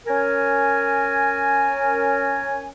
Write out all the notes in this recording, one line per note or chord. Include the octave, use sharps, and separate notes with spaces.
C#4 A#4 G#5